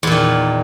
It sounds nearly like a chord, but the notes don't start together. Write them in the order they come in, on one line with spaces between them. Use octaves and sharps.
E2 A#2 D#3